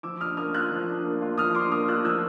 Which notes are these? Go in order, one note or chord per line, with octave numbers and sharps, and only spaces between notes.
F3 D6 E6
D4 D#6 F6
A#3 D#6 F6
F4 E6 F#6
F3
D4
A#3
F4
F3 D#6 F6
D4 C6 D6
A#3 D#6 F6
F4 E6 F#6
F3 E6 F#6